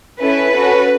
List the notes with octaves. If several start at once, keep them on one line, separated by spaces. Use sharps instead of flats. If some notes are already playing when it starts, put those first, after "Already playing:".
C#4 E4 A4 B4
C#4 F#4 A4